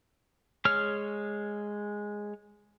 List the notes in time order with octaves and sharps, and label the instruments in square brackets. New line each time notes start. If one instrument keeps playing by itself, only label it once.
[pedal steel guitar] G#3 G#4 C#5 F6